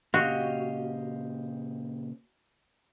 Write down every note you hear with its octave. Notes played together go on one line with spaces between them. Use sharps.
A#2 C#3 F#4 G4 D#5 F5